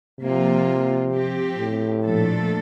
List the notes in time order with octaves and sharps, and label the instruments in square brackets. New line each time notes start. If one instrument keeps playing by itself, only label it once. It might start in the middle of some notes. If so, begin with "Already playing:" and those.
[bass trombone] C3 [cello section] F3 A#3 F4
[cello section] F3 C4 G4
[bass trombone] A2
[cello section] A#2 F3 A3 D4 A4